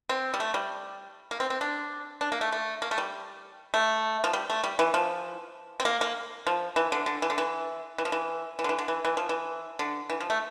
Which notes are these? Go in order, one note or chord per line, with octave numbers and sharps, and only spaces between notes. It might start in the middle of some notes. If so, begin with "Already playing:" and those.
C4
G3
A3
G3
A#3
C4
C4
D4
D4
A#3
A3
A3
A#3
A3
G3
A3
F3
G3
A3
G3
E3
F3
C4
A#3
A#3
F3
E3
D3
D3
E3
D3
E3
E3
F3
E3
E3
D3
E3
D3
E3
E3
F3
E3
D3
E3
F3
A3